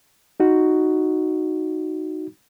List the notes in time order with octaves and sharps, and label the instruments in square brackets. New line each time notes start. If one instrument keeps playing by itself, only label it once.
[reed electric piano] D#4 F#4